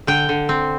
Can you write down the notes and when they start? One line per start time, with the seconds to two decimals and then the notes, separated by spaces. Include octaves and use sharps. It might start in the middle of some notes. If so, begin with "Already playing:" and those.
0.07 D3 G5
0.29 D3
0.49 C4